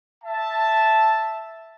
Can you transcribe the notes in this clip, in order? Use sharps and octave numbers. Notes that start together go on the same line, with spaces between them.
E5 A5